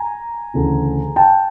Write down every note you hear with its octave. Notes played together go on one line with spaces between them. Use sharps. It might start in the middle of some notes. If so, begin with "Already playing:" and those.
Already playing: G#5 A#5
D2 C#3 E3
G5 A5